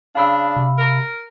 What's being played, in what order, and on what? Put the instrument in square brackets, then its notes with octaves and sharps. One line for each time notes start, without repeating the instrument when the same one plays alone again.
[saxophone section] C#3 D4 [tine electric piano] F5 B5 E6
[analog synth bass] C3
[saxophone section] A#4